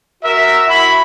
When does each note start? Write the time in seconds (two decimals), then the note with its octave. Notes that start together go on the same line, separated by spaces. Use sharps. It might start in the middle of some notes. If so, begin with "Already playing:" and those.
0.23 F#4 A#4 E5
0.68 E4 F#4 B5